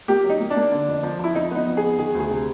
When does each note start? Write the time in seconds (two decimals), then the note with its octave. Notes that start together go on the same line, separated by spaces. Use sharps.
0.08 A#3 G4
0.24 F#3
0.30 D#4
0.40 A#3
0.50 D4
0.56 A#3
0.72 D3
0.88 F2
1.03 F3
1.19 F3 E4
1.35 F2 D#4
1.51 B3 D#4
1.67 F2
1.77 G#4
1.83 B3
1.99 D#3 G#4
2.14 D2
2.20 G#4
2.30 C3